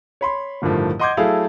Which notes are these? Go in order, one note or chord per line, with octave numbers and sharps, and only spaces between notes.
C#5 B5 C6
A1 G2 D3 D#3 F3 A3
D#5 F#5 C6 D6 G6 G#6
F#3 A3 E4 G#4 A4 F5